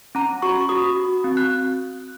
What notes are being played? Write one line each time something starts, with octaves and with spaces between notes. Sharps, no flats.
C#4 A#5
F#4 C#6
C#6
F#4 D#6
F#4
C4
F#6